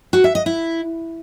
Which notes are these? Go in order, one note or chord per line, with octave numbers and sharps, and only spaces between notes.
F#4
E5
D#5
E4